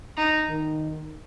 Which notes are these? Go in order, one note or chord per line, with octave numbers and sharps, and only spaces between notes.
D#4
D#3